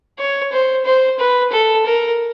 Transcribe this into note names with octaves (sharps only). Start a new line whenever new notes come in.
C#5
C5
C5
B4
A4
A#4